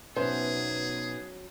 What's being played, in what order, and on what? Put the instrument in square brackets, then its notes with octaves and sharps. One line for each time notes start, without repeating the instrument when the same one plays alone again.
[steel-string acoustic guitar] B2 D#4 E5 [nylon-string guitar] F#3 C#4 [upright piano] B3 C5 [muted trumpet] G#4